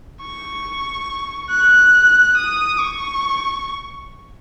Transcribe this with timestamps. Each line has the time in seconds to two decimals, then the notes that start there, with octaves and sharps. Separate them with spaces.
0.21 C#6
1.50 F#6
2.37 D#6
2.80 C#6